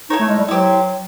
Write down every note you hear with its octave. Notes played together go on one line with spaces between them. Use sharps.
D#4 E4 A4 C#5
A3
G#3
G3
F#3 E4 G4 C5